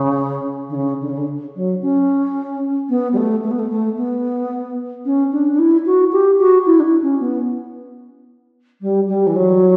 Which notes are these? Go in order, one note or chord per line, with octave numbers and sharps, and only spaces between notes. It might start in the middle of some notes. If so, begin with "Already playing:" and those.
Already playing: C#3
D3
C#3
D3
C#3
D3
F#3
C#4
B3
G3
A3
A3
B3
A3
A3
B3
C#4
D4
D4
E4
F#4
G4
F#4
E4
D4
E4
C#4
B3
G3
G3
E3
F#3